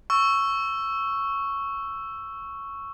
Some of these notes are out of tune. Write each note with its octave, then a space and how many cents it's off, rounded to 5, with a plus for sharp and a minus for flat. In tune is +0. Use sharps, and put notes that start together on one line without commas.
C#6 +0 E6 +10